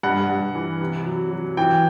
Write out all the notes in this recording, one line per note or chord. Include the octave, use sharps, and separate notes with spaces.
G2 F#5
G2
E3
C3
F#3
F#3
E3 G5